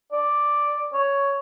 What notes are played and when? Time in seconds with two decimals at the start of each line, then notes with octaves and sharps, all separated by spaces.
0.12 D5
0.93 C#5